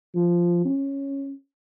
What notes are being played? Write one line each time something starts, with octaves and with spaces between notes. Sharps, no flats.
F3
C#4